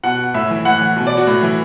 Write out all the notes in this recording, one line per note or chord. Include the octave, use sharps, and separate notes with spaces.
B2 F#5
A2 E5
E3
A2 F#5
E3
B2
D5
F#4
A2
E3